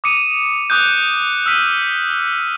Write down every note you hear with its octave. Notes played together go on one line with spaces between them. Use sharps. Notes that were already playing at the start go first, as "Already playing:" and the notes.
D6 D#6 C#7 D#7
D6 D#6 F#6 G6
E6 F6 B6 D#7